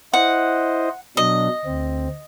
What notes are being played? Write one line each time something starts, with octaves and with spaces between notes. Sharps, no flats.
E4 C5 D#5 F#5
B2 F#3 D4 D#5
D2 C4